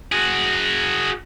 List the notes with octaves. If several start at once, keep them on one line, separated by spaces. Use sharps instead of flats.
F#4 G#4